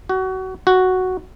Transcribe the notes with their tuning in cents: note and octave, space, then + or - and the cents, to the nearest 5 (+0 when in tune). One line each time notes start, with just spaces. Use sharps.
F#4 +25
F#4 +0